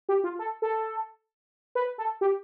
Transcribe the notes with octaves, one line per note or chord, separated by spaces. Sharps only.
G4
F4
A4
A4
B4
A4
G4